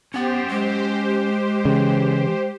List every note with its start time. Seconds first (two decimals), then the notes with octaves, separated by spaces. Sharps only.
0.14 B3 C#4 G4 C5 F#5
0.50 G#3
1.65 C#3 E3